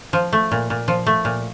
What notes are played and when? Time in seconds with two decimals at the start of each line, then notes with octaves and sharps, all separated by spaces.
0.13 F3
0.33 A3
0.52 A#2
0.70 A#2
0.88 F3
1.06 A3
1.25 A#2